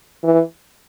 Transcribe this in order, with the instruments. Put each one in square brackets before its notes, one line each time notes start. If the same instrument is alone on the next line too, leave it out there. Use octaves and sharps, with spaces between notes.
[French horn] E3